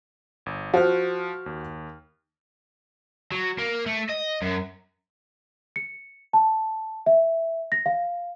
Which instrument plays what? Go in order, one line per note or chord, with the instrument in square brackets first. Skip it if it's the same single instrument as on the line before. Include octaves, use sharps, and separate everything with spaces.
[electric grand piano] G1
[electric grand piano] F3 F6 [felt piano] F#4 C5
[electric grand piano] D#2
[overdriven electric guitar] F#3
A#3
A3
D#5
F#2
[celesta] C#7
A5
E5
A#6
F5